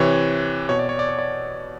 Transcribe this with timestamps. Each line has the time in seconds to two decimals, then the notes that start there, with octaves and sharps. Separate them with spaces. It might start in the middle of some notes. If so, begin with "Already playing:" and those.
Already playing: C3 E3 C#5
0.69 B2 C#5
0.79 D5
0.89 C#5
0.99 D5
1.09 C#5
1.19 D5